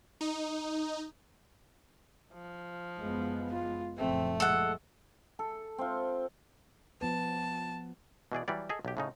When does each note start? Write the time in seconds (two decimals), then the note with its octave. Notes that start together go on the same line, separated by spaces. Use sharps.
0.21 D#4
2.34 F3
3.00 F#1 G#3 B3
3.50 F4
3.98 F#1 A#2 F3 A3 C4
4.40 G#3 A4 F#5
5.39 A4
5.78 C4 F4
7.01 F3 B3 B4 A5
8.32 B2 E3 G#4 D5
8.48 E3 F#3 G3 D5
8.69 G#4 A4 D#5
8.85 B1 G4
8.97 A2 C#3 D#4